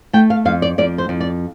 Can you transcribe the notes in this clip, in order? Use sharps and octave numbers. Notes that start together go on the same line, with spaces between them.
A3 G5
F5
F2 F5
D5
F2 D5
C5
F2
D5